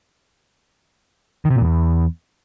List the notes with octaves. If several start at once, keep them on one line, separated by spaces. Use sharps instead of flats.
D#3
C3
A#2
E2